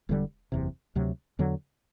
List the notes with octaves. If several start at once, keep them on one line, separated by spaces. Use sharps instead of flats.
E1 E2 D3 G3
F#1 E2 C3
D2 C3 F#3
E2 D3 F#3